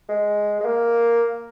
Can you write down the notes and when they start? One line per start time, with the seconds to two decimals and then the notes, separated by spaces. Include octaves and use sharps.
0.09 G#3
0.60 G#3
0.65 A#3